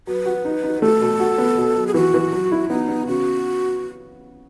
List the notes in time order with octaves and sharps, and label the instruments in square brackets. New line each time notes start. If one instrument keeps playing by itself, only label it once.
[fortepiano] F#3 [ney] B4
[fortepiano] F#4
D#4
D#4
[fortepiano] A3 [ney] A4
[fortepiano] B2
F#4
B3
B2
F#3
[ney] G#4
[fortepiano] E3 [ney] F#4
[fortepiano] E3
F#3
E4
[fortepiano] B3 [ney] D#4
[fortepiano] B3
[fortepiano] C#3 [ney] F#4